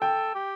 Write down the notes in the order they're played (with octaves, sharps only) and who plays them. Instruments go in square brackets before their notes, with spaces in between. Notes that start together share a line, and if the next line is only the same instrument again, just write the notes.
[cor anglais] A4 [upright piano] G5
[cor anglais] G4